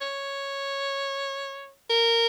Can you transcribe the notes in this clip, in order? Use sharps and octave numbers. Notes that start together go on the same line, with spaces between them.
C#5
A#4